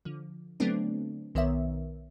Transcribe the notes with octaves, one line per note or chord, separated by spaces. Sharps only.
D3 F3
D3 F#3 A3 B3 C4 D4
B1 D#3 B3 A#4 C#5 E5